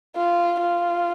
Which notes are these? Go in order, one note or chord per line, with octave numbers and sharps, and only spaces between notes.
F4
F4